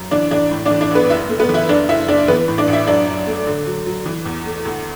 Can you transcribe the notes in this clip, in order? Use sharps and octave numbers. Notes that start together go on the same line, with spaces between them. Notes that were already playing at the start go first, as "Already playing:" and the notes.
Already playing: F#2
E3 D4 D5
E3 D4 D5
A2
D4 D5
E3
D4 D5
A1 B3 B4
F#1 E4 E5
A3
B3 B4
E3
E4 E5
F#1 D4 D5
F#1 E4 E5
F#1 D4 D5
E3 B3 B4
A2
D4 D5
A1
E4 E5
F#2 D4 D5
F#2
A3
D3
F#3
F#3
E3
E2
A3
D2